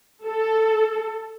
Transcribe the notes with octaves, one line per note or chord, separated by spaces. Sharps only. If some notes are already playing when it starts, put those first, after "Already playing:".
A4